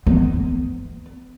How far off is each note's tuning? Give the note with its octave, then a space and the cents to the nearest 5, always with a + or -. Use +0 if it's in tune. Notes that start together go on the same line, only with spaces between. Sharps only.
B3 +30